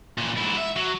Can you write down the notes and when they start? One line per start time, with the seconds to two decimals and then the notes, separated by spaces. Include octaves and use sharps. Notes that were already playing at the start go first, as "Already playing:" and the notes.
0.18 A#2 E3
0.38 G#2 E4
0.58 E5
0.76 F#3